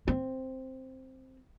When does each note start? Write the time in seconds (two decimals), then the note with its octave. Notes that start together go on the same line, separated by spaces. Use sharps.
0.08 C4